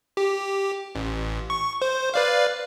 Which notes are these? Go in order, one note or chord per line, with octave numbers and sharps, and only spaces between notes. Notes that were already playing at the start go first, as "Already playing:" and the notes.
G4
A1
C#6
C5
B4 D5 F5